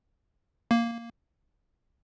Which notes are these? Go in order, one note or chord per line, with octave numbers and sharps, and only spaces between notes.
A#3